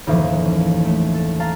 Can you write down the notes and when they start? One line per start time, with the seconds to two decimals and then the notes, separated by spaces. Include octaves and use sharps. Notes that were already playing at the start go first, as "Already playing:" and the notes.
0.07 F#1 D#2 A2 E3 F3
0.45 C#4
0.85 A3
1.14 A4
1.40 F5 A5 A#5 A6